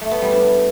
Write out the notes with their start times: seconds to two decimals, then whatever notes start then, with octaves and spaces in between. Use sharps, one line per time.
0.01 A3
0.11 B3
0.22 G3
0.32 D4